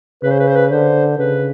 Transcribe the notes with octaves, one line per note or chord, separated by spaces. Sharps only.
C#3 B4
C5
B4
C5
B4
D3 C5
C#3 B4